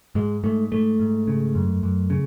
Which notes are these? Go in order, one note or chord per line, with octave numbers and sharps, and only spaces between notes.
G#2 G#3
G#2 A3
G#2 A3
G#2
C#3
F#2
F#2
C#3